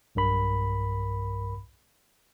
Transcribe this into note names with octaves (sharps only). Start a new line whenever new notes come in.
B1 G2 A#4 B5